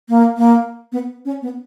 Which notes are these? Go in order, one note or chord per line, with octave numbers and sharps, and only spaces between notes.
A#3
A#3
B3
C#4
B3